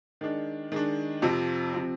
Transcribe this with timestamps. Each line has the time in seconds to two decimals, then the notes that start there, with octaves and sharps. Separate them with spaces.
0.21 D#3 G#3 D4
0.72 D#3 G#3 D4
1.22 F2 C3 F3 C4
1.73 C3 F3 C4